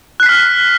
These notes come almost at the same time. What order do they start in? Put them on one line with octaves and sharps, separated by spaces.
F#6 C7 B6 F6